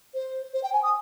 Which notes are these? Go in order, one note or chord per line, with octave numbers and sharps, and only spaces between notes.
C5
C5
G5
G#5
D#6